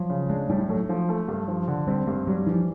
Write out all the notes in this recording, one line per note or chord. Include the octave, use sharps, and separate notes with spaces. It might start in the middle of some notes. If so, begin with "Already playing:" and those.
Already playing: F3 F#3
C#3
G#3 D4
A2 G3
F#3 A3
F3
A3
G2
F3
D3
G3 C4
G2 G#3
F#3 G3
E3 F3